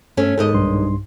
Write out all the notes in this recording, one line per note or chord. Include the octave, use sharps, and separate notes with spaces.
G2 A3 C#4
D#2 G#2 A4 D#5
B1 G2 C6